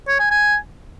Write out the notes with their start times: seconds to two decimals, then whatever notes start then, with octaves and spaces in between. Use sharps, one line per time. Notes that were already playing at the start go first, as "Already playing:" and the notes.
0.08 C#5
0.19 G#5
0.31 G#5